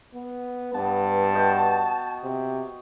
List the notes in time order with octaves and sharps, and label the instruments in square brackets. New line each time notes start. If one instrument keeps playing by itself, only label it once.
[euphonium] B3
[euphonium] G2 [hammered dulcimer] B3 [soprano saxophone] A5
[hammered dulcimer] F#4 D#5 G5
[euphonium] C3